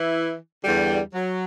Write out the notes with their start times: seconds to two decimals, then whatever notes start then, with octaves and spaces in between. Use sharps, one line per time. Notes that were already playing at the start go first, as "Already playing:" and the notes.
Already playing: E3 E4
0.65 E2 D3 G3
1.14 F#3